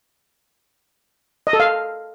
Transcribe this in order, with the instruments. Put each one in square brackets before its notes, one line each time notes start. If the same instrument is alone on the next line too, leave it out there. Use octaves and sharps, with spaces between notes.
[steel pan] D#5
A4
F5